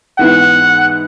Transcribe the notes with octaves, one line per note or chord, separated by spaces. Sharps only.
G#2 E3 B3 E4 F#5